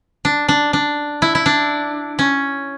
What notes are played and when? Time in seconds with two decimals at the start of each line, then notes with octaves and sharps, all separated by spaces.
0.25 D4
0.48 D4
0.73 D4
1.22 E4
1.35 E4
1.46 D4
2.19 C#4